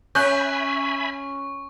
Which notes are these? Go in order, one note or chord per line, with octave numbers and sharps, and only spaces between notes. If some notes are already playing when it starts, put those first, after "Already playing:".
C#4 E5 G#5 B5 C#6 F#6 G6